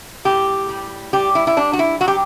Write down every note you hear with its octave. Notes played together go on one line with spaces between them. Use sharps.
A2 G4
G3
G3 G4
E4
E4
G3 D4
F#4
E4
F#3 F#4
G4